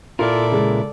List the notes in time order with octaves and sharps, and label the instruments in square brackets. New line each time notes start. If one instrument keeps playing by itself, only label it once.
[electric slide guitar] A#2 E4 A#4 [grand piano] F4 [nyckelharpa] A4 D5
[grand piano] C#3 G#3